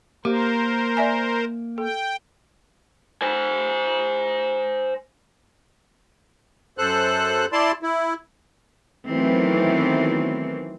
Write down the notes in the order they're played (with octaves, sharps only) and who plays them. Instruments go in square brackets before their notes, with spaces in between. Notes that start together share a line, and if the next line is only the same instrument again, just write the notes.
[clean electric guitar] A#3 [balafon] G4 [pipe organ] A#4 C5
[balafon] D5 E5 G#5
[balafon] A4 [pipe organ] G5
[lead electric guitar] C5 G#5
[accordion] F#2 A4 C5 F#6
E4 D5 A5 C6
E4
[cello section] D#3 E3 F#3 A3 B3 C4